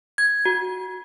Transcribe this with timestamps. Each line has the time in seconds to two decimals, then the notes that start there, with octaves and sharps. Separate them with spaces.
0.18 G#6
0.46 F#4